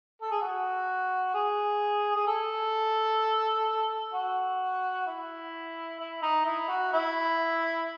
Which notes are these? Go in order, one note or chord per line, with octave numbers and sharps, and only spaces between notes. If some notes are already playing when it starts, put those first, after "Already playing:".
A4
G#4
F#4
G#4
G#4
A4
F#4
E4
E4
D#4
E4
F#4
E4